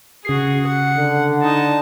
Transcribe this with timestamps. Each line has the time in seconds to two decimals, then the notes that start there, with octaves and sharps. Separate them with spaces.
0.25 C#3 F#4 G#4 C7
0.66 F#5
0.97 D3
1.42 D#4 A5